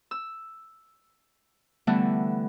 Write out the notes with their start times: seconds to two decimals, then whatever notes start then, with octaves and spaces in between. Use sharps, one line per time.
0.11 E6
1.87 D3 E3 G3 A3 B3